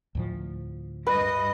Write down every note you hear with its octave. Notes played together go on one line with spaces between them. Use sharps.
D2 A2 F3
G2 G3 B4 D#5